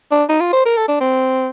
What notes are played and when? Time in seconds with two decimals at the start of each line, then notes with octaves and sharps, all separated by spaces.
0.11 D4
0.29 D#4
0.41 F4
0.53 C5
0.65 A#4
0.77 A4
0.88 D4
1.01 C4